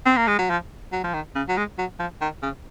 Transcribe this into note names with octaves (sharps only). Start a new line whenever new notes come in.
C4
A#3
G#3
F#3
F3
F#3
F3
D#3
C#3
F#3
G#3
F#3
F3
D#3
C#3